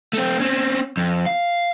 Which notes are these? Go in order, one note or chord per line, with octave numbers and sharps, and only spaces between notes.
A3 C4
C4 C#4
F2
F5